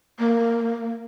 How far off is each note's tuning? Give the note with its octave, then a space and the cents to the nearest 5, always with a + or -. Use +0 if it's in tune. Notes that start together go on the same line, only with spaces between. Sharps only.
A#3 -10